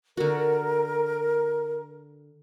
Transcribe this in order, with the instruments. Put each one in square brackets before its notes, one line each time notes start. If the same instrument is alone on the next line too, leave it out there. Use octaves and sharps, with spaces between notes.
[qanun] D3 F#4 [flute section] A#4